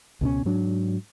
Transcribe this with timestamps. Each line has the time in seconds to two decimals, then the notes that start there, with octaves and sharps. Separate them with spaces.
0.21 C#2 B2 C#4
0.45 G#2 F#3 D4